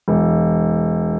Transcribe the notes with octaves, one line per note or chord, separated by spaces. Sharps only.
E1